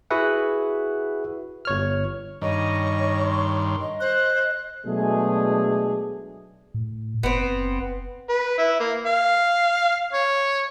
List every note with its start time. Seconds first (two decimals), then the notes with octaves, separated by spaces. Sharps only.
0.10 E4 F#4 G#4 B4 E5 F#5
1.65 G1 C#5 F6
2.42 G2 D#3 C#5 D#5 C#6
3.25 C6
3.81 D#5
4.00 C5 F#6
4.85 B2 F#3 G#3 A3 D4 G#4
6.74 A2
7.23 F#1 B3 C4
8.29 B4
8.58 E4
8.80 A#3
9.06 F5
10.13 C#5